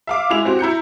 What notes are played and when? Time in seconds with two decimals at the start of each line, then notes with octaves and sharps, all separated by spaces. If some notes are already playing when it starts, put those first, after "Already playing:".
0.07 E5 F5 D6
0.30 G#3 E4 F7
0.45 C4 F#4 G4
0.59 E4 A#5 G6 C#7